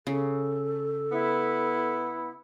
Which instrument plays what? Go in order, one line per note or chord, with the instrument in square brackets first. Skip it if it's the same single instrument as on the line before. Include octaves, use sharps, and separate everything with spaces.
[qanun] C#3 [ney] A4
[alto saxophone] B3 [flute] E4